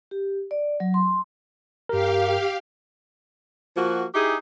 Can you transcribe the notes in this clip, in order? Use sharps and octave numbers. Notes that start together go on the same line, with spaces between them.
G4
D5
F#3
C6
G2 G4 A#4 F5
F3 A#3 F#4
D#4 E4 G4 G#4